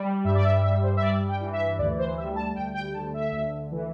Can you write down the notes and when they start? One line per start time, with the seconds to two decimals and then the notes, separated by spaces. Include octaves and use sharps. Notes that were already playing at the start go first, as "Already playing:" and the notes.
Already playing: G3
0.24 G2 E5
0.35 D5
0.44 E5
0.63 G3 E5
0.83 C5
0.97 E5
1.02 G2 D5
1.28 G5
1.41 E3
1.53 E5
1.78 D2 D5
1.98 C5
2.17 G3 E5
2.36 A5
2.56 D2 G5
2.74 G5
2.94 D3 A5
3.14 E5
3.32 D2
3.71 E3